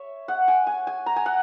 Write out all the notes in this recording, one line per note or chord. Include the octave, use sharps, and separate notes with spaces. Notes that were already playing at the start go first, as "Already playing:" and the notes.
Already playing: C#5 E5
F#5
G#5
G#5
G#5
A#5
G#5
F#5